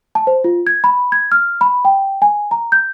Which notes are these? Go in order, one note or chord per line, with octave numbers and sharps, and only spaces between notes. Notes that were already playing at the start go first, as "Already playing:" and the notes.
A5
C5
F4
G#6
B5
G#6
F6
B5
G5
G#5
A#5
G6